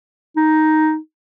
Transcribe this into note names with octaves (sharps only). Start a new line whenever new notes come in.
D#4